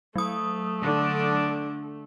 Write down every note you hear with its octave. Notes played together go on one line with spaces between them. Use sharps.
F#3 A3 D#6
D3 D4